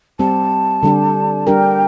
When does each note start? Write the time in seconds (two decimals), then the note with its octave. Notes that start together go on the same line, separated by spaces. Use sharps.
0.19 G3 C4 G4 A5
0.83 D3 G3 D4 G4
1.46 G3 D4 G4 A#4 G5